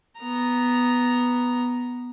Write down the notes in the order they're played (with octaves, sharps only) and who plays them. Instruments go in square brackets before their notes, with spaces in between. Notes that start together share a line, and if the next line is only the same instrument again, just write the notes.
[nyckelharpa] B3 A#5